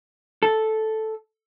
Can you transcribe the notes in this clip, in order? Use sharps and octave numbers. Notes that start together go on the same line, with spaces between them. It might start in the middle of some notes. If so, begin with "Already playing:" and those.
A4